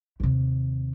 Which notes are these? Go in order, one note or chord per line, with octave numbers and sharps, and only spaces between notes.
D#2 C3